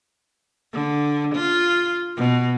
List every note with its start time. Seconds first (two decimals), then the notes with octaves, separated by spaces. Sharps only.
0.73 D3
1.35 F4
2.17 B2